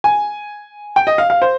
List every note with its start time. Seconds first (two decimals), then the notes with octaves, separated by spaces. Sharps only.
0.04 G#5
0.96 G5
1.07 D#5
1.18 F5
1.30 F5
1.42 C5